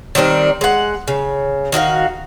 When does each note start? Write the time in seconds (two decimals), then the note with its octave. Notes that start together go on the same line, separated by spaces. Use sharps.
0.15 D#3 G3 C4 D4
0.61 G#3 F#5
1.08 C#3
1.72 D#3 F#4 D5 F5